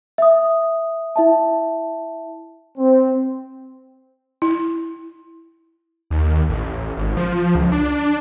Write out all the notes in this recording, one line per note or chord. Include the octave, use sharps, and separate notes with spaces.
E5 D#6
E4 E5 A5
C4
E4
D#2
A1
G#1
F3
C#2
D4